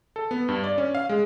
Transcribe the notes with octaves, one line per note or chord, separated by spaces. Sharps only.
A4
B3
G2
D5
C#4
F5
G#3